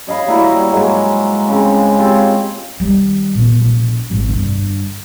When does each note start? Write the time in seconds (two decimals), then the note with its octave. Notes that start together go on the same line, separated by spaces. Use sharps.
0.07 C#5 D#5 F5 B5
0.26 G3 A#3 E4 F#4
0.52 G3
0.72 G#2 F#3 G#3 A#3
1.48 C#3 C4
1.99 C4 F4 G4 C#5
2.80 D#3 G3
3.35 A#2 B3
3.61 A#1
4.10 G#1 E3
4.29 G2 D3